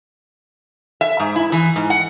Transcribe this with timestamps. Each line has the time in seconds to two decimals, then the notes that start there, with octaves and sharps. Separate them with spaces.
1.01 E5
1.20 G#2
1.36 E4
1.52 E3
1.76 G#2
1.90 F#5